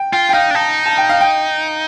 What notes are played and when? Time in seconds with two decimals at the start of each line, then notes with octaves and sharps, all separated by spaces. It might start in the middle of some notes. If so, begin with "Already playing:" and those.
Already playing: G5
0.13 F4 G5
0.29 G5
0.33 D#4 F5
0.51 D4
0.55 D#4 A5
0.86 A5
0.98 G5
1.09 F5
1.21 G5